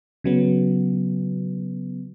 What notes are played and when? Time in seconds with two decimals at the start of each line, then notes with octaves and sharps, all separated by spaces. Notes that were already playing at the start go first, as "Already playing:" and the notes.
0.24 C#3 F#3 B3